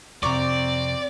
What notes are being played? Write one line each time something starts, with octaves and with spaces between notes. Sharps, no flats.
F2 C3 C4 D5 A#5 C#6 D6